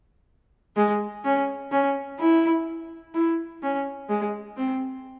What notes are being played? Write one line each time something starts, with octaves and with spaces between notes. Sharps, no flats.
G#3
C#4
C#4
E4
E4
C#4
G#3
C4